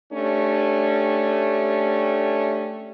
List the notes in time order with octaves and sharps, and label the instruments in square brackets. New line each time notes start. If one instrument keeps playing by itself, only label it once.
[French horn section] A3 C#4 D4 G4